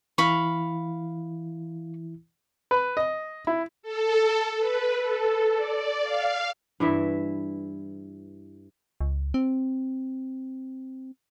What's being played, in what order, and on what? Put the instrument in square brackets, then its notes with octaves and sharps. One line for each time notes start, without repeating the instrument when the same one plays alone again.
[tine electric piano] E3 E4 [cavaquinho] F5 B5 C#6
[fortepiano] B4
D#5
E4
[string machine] A4
B4
A4
D5
F5
[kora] G2 E3 E4 E5
[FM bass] C#2
C4